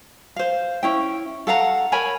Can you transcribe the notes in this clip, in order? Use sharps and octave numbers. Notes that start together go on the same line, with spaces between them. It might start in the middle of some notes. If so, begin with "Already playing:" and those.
C5 F5
C#4 E4 G5
A4 F5 F#5 A#5
A#4 C#5 G#5 B5